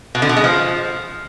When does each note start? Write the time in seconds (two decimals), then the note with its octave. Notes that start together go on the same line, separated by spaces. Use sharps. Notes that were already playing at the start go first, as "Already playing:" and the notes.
0.15 B2
0.22 D3
0.29 B2
0.37 G#3
0.44 F3